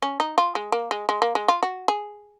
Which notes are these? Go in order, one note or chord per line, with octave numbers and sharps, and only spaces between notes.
C#4
D#4
F4
G#3
A#3
G#3
G#3
A#3
G#3
F4
F#4
G#4